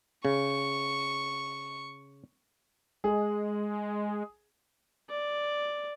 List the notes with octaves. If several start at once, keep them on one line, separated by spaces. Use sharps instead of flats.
C#3 C#6
G#3 G#4
D5